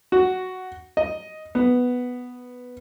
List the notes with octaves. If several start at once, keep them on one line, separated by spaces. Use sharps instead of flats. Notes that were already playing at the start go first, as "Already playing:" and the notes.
F#4
D#5
B3